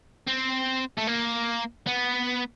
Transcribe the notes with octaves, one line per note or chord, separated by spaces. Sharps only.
C4
A3
A#3
B3